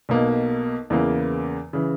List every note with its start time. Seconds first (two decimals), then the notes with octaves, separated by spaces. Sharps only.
0.09 B1 B2 A#3
0.90 E2 C#3 E3 A#3
1.73 C#3 E3